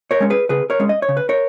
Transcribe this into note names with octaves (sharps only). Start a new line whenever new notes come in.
A#4 C#5
G#3 C#4
G#4 B4
C#3 G#4 B4
A#4 C#5
G#3 C#4
D#5
C#5
C#3
B4
A#4 C#5